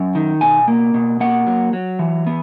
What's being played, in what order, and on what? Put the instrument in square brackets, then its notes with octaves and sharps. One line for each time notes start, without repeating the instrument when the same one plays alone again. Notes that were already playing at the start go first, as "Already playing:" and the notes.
Already playing: [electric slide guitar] F#2
D#3
B2 G#5
A#3
B2
A#3 F#5
F#3
F#3
E3
B3